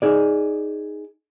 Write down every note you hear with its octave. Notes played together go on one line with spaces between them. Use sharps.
D#4 G#4 D5